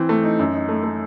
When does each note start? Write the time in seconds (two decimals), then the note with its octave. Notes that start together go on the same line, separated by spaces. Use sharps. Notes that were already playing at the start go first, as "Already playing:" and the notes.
Already playing: E3 C4
0.09 A3
0.23 D#4
0.39 F#2
0.54 D#4
0.69 A3
0.83 A3